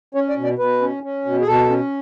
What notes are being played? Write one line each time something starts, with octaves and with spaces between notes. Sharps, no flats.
C#4 C#5
D5
B2
D5
B2 B4
C#4
C#4
B2
G#4
B2 A4
C#4